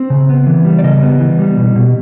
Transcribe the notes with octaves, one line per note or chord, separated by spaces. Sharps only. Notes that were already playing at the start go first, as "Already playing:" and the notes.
Already playing: C4
C#3
B3
E3
G3
D5
C#3 D#5
B3
E3
G3
B2
B2